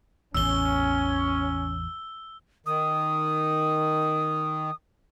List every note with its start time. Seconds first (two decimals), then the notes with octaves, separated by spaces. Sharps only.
0.34 A1 E2 C#4 E6 G7
2.66 D#3 D#6